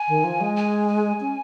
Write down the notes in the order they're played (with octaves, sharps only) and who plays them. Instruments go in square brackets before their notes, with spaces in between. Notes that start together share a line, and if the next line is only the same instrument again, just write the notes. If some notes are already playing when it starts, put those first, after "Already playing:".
Already playing: [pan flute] G#5
[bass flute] D#3
F3
G#3
[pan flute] G#5
G#5
[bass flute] C#4